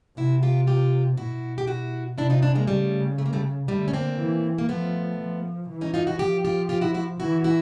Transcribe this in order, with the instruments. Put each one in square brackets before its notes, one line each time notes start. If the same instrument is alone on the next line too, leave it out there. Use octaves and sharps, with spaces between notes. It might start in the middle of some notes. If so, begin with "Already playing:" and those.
[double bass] C3 [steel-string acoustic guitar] E4 F#4
[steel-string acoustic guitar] F4 G4
F4 G4
[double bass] B2 [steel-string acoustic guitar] E4 F#4
[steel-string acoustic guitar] G4
E4 F#4
[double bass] C3 [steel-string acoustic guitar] D4 E4
[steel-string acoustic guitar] D#4 F4
D4 E4
G#3 A#3
[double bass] C#3 [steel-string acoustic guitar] G3 A3
[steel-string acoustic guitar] A3
A#3
G3 A3
[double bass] D3 [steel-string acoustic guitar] G3 A3
[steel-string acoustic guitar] C#4
A#3 C4
[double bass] E3
[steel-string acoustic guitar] A#3
[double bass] F3 [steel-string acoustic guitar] A3 B3
[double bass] F3
E3
[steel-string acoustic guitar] C#4 D#4
D#4 F4
E4 F#4
[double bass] F3 [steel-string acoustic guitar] F4 G4
[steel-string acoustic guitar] F4 G4
F4 G4
E4 F#4
E4 F#4
[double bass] E3 [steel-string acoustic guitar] E4 F#4
[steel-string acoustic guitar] E4 F#4